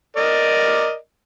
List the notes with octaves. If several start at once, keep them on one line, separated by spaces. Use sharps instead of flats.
A#4 D5 D#5